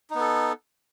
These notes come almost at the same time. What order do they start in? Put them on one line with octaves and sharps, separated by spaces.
D#4 B3 A4